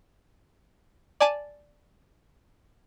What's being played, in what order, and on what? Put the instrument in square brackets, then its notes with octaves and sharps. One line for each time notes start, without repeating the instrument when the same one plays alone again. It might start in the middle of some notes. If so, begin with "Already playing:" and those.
[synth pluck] D5 G#5 A5 D6 D#7